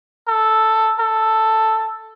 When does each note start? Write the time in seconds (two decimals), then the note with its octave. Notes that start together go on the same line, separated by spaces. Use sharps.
0.28 A4
0.99 A4